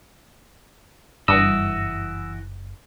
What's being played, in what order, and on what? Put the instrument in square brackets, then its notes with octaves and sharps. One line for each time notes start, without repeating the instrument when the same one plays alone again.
[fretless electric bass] F#1 [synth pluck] G2 [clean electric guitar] E3 F#4 D#5 [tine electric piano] E6